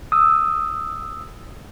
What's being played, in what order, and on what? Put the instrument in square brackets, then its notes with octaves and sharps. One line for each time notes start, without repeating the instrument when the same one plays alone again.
[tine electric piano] D#6 E6